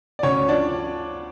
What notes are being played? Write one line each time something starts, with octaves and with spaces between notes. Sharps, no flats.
D5
D2 C#4 C#5
F3 D4 D5